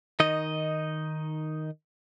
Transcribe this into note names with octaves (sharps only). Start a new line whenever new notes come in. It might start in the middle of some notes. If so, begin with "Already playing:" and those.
D#3 D#4 D#5